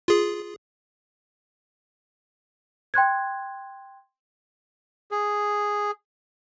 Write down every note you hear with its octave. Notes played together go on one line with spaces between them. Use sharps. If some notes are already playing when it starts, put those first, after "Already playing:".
F4 G#4
G5 C6 F#6 G#6
G#4